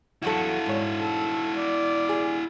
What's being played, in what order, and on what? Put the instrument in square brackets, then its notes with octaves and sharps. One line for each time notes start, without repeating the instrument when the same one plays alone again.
[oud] E2 F#3 A4 [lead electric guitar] E4 F#4
[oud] G#2 C#5
[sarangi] A4
D5
[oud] G#4